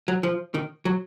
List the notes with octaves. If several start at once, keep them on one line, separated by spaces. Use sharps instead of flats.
F#3
F3
D#3
F#3